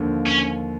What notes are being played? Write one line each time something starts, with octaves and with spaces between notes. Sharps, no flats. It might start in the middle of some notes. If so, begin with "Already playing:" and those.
Already playing: D#2 D3 F3
C#4